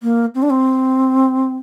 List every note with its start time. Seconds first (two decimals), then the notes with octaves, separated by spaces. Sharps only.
0.03 A#3
0.35 C4
0.43 D4
0.50 C4